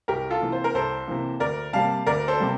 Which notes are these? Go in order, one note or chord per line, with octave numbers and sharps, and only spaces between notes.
C2 G4 A#4
F4 A4
C3 E3 A#3
C5
A#4
C2 A4 C5
C3 E3 A#3
D2 A#4 D5
C3 G3 A#3 F5 A5
D2 A#4 D5
A4 C5
C3 G3 A#3